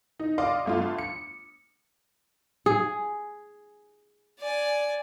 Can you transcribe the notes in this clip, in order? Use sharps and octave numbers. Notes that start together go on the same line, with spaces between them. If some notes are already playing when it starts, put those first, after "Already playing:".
D#4
D5 D#5 F5 C6 D6 D#6
G1 A3 F4
C#7
G#4
D5 G#5